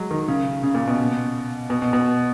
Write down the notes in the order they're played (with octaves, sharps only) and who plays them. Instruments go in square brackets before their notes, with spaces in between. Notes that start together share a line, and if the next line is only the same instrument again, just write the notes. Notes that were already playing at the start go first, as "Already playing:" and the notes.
Already playing: [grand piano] F#3 G#3
D#3
C#3
C#3
A#2
B2
B2
B2
B2